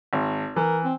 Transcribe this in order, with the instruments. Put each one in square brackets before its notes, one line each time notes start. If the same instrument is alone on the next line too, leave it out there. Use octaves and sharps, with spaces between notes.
[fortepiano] G#1
[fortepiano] E3 [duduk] A#4
[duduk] C4